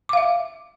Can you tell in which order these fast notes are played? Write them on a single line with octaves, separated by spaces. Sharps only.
D6 F5 E5